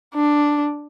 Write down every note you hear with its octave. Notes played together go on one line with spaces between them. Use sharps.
D4